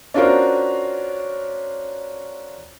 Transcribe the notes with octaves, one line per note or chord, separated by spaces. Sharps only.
C#4 D4 F4 F#4 A#4 C5